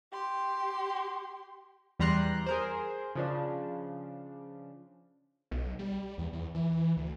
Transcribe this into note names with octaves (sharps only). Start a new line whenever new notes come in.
G4 C6
E2 G3 A#5 C6 F#6
G#4 A#4 C5
C#3 F3 D4
B1
G3
E2
E2
E3
D2